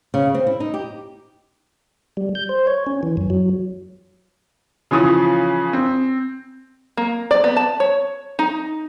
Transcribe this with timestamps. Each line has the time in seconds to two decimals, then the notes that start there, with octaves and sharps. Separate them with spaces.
0.14 C#3
0.35 C4
0.47 E4
0.60 D#4
0.74 G4
2.17 G3
2.35 G6
2.49 C5
2.67 C#5
2.87 C#4
3.03 E3
3.17 F#2
3.30 F#3
4.91 C#3 E3 F3 D#6
5.73 C4
6.97 A#3
7.31 D5
7.44 B3
7.56 A5
7.80 C#5
8.39 D#4